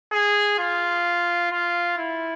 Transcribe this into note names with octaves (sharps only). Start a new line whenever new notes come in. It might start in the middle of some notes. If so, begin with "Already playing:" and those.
G#4
F4
F4
E4